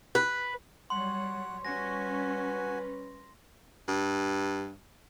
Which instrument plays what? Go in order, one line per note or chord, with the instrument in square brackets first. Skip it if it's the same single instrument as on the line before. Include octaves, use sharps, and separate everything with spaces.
[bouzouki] B4
[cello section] F#3 G3 C#5 [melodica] F#5 [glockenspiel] C6
[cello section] G3 C#4 [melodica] F#4 G#5 [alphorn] B4 [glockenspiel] A#6
[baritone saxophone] G2